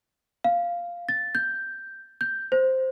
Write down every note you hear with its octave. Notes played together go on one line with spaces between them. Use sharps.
F5
A6
G6
G6
C5